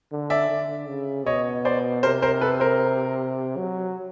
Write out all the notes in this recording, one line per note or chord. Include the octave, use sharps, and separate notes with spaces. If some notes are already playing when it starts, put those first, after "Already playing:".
D3
D5 E5
D3
C#3
B2 C#5 D#5
C5 D5
C3 A#4 C5
A#4 C5
A4 B4
A#4 C5
F#3